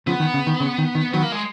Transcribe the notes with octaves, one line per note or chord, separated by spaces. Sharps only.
C#3 F3 B3
D#3
C#3
D#3
C#3
D#3
D#3
D#3 F#3 B3
A#3
G#3